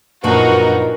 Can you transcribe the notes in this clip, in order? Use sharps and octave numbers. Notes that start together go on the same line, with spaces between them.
F#2 A#2 F3 D4 D#4 F#4 A#4 B4